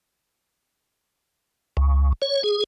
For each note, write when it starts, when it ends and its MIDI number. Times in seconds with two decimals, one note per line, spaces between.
1.77 2.13 37
2.22 2.43 73
2.44 2.64 68